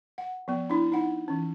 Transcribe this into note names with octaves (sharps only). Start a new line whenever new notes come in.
F#5
F3 B3
D4 E4
D#4 F#5
E3 C#4